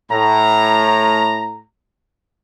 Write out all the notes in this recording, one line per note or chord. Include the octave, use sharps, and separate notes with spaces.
A2 A#5